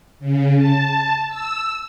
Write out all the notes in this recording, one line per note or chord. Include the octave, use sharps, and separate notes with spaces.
C#3
A5
E6